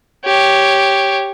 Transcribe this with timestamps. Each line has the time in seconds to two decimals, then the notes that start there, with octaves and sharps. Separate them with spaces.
0.25 G4 C#5